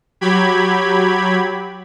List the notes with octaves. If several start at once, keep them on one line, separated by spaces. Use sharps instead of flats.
F#3 G4 B5 G#6